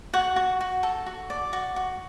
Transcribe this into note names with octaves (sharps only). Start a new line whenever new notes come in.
F#4 F#5
F#4
F#4
A4
F#4
D5
F#4
F#4